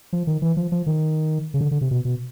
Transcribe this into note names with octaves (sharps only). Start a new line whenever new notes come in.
F3
D#3
E3
F3
F3
D#3
C#3
D3
D3
C3
B2
B2